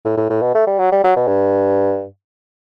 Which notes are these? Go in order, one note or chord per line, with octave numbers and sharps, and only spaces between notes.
A2
A2
A2
B2
A3
G3
F#3
G3
F#3
B2
G2